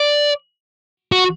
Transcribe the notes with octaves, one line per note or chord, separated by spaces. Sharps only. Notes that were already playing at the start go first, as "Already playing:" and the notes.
Already playing: D5
F#4